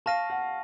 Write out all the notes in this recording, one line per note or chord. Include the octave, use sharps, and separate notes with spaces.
F5 A5 C#6 F6 A#6 D#7
F#5